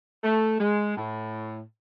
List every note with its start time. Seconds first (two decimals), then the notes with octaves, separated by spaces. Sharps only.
0.24 A3
0.60 G#3
0.96 A2